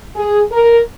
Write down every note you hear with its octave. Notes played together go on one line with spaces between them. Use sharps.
G#4
A#4